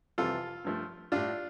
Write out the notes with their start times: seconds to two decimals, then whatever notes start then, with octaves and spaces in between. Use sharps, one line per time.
0.18 F2 C3 E3 G3 F4 A4
0.65 G2 F3 A3
1.12 A2 G3 D4 F4